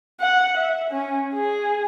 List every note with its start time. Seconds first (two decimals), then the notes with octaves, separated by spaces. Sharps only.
0.21 F#5
0.57 E5
0.90 C#4
1.34 G#4